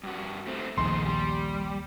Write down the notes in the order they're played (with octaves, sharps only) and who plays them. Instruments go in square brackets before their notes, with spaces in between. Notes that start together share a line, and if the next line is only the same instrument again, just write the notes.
[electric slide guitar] G2 F#4
A3 C4
[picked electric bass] A#1 D#2 [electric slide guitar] A3 D#4 G#4 [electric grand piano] C6
[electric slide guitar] G3